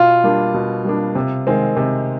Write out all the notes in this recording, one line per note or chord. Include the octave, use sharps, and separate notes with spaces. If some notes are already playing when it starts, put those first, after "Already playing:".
Already playing: B2 F4
G3 A#3 D4
B2
G3 A#3 D4
C3
D#3 G#3 C4
C3